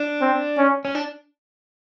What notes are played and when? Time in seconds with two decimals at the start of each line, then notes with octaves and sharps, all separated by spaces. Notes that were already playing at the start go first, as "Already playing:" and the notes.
Already playing: D4
0.21 C4
0.58 C#4
0.85 C#4
0.95 D4